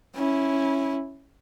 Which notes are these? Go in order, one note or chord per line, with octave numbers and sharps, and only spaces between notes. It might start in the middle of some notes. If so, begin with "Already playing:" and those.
C#4 E4